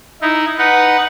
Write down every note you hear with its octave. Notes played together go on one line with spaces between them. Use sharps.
D#4 E4
D#4 B4 F#5